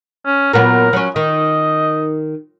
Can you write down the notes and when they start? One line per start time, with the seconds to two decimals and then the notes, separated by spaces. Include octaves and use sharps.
0.26 C#4
0.53 A#2 F#3 B3 A#4
0.93 F#3 C#4
1.16 D#3 D#5